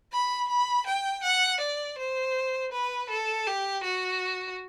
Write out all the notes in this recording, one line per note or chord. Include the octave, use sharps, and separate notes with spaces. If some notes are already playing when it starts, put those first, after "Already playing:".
B5
B5
G5
F#5
D5
C5
B4
A4
G4
F#4